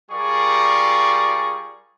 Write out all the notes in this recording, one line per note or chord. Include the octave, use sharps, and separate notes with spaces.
G3 F4 G#4 A#4 D5 C#6